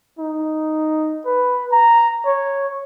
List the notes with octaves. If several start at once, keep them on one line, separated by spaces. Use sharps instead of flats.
D#4
B4
A#5
C#5